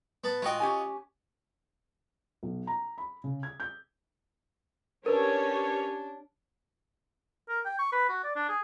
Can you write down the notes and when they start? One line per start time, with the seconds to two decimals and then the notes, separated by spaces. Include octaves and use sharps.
0.24 B3 A5
0.42 G#3 F4 F#4 D#5 G5
0.60 C#4 G4 G#5
2.43 B1
2.67 A#5
2.98 B5
3.24 C#3
3.43 G#6
3.60 G6
5.06 C#4 D4 G4 A#4 B4 C#5
7.49 A#4
7.65 G5
7.79 C#6
7.92 B4
8.09 F#4
8.24 D5
8.36 D4
8.49 G#4